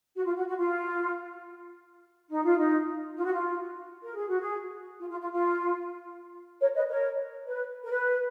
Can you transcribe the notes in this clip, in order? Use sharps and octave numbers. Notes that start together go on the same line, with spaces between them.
F#4
F4
F#4
F#4
F4
D#4
F4
D#4
F4
F#4
F4
A#4
G#4
F#4
G#4
F4
F4
F4
F4
A#4 C#5
B4 D#5
A#4 C#5
B4
A#4
B4